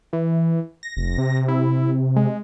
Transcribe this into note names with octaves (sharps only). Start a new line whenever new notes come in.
E3
A#6
F1
C3
E4
G#3